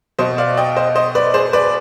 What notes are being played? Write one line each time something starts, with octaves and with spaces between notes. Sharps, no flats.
B2 C5 D#5
D5 F5
D#5 G5
C5 D#5
C5 D#5
B4 D5
G#4 C5
B4 D5